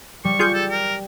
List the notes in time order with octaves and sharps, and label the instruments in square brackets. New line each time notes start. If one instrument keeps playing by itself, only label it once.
[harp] G3 [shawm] C#6
[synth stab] F4 G#4 G6
[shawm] A4
A#4